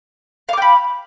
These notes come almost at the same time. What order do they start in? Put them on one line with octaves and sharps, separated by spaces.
F5 D6 G5 B5